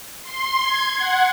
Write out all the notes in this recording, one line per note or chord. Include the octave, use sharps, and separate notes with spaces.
C6
G#6
F#5